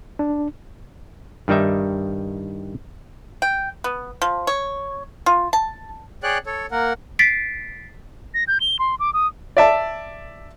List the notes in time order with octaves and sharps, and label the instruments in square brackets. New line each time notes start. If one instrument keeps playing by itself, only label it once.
[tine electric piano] D4
[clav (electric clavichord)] G2 D#3 G3 D#4 E5
[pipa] G5
B3
F3
C#5
F4
A5
[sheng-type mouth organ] G#4 C#5 D5 G5 F#6
A4 C#5
A#3 A#4 F#5
[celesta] A6 B6 C7 D7
[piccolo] A#6
G6
G7
C6
D6
D#6
[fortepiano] D5 E5 A5